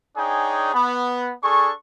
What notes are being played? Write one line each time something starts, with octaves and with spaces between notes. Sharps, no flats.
D4 D#4 G#4 C#5 G5 G#5
B3
D4 G#4 A4 C#6